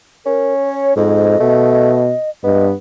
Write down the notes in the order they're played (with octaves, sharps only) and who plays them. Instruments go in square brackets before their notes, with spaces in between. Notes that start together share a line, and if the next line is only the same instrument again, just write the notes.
[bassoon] C#4 [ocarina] A#4
[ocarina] C#5
[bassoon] F2 [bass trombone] G#2 [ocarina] D#5
[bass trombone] B2 [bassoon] A3
[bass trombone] G2 [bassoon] B3 [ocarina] D#5